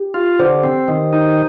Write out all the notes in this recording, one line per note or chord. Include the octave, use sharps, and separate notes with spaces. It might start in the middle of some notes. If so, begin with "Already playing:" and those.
Already playing: G4
F4
D3 C5
C4
D#3
D#4